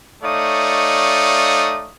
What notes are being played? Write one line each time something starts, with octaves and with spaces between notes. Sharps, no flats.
A3 D#4 C#5 D5 F5 D#6